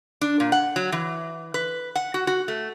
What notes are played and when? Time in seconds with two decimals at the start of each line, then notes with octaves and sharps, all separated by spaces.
0.21 D4
0.40 A#2
0.52 F#5
0.76 F#3
0.92 E3
1.54 B4
1.95 F#5
2.14 F#4
2.27 F#4
2.48 A3